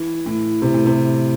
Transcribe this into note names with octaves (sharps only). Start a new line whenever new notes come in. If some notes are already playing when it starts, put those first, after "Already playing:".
Already playing: E3
A2
C3
A2
C3